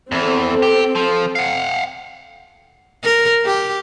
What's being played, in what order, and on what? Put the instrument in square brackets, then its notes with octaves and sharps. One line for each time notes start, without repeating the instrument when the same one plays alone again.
[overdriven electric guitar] E2 E3 [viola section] C4 A4
[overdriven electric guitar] G4
F3
F5 F#5
[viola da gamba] A#4
G4